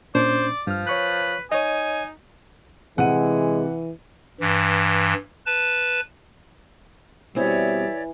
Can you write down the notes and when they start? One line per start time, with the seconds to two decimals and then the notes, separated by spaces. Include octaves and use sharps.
0.15 A#2 C#4 D4 C5 D5
0.67 G2 F3 F6
0.87 B4 C#5 C#6 F#6
1.52 D#4 C#5 D#5 G#5
2.98 C3 E3 G#3 F#5 D#7
4.40 G2 E3
5.46 B4 A5
7.36 B2 E3 G3 C4 C#5 D5 E5